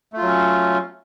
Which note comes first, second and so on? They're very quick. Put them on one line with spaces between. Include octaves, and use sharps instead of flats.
A3 F4 F#3 C#4